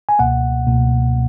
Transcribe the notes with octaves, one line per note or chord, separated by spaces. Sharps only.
G#5
C#2 B2 A#3 F#5
C#2 B2 A#3